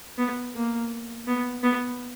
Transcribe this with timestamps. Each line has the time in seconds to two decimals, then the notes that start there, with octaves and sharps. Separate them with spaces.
0.18 B3
0.55 A#3
1.27 B3
1.63 B3